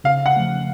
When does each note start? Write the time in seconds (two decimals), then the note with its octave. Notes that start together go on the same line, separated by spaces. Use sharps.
0.04 C#3 F5
0.26 F#5
0.36 F3 A3